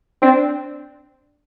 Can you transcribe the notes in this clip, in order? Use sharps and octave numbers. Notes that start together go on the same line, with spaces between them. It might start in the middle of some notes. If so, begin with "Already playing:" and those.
C4 D4